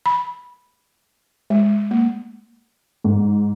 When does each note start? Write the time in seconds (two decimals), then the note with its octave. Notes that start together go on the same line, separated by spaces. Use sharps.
0.06 B5
1.50 G#3
1.91 A#3
3.04 G#2